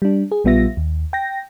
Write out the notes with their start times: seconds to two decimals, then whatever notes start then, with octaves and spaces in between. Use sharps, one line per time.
0.02 G3 D4
0.31 G#4
0.44 A#1 G3 B3 F4 E5 A#6
0.77 D#2
1.13 G5 A#6